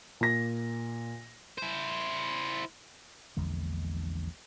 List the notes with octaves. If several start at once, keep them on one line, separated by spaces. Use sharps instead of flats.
A#2 A#6
E4 C5
A#1 E2 D3 G#3